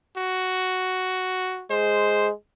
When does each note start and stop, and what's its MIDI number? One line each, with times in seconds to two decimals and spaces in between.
0.17 1.65 66
1.70 2.31 56
1.70 2.29 72